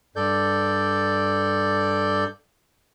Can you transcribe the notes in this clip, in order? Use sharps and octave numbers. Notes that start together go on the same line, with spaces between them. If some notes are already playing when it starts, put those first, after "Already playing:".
G2 A4 D5 G6